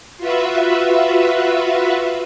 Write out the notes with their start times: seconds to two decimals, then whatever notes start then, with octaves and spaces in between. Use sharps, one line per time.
0.18 F4 F#4 B4 E5